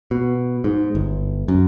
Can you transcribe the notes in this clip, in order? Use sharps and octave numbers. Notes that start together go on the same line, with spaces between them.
B2
G#2
G1
F#2